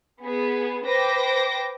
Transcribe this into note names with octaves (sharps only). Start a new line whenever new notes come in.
B3 G#4
B4 C5 G5 D6 A#6